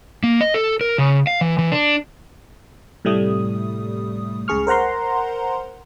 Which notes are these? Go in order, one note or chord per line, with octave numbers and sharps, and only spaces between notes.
A#3
D#5
A4
A#4
C#3
F5
E3
E3
D4
A2 C3 G3 A3 D#6
C#2 C#3 G#4 C#6 F6
A#4 C5 F#5 A#5 C6